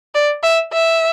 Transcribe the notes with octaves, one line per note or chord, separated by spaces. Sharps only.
D5
E5
E5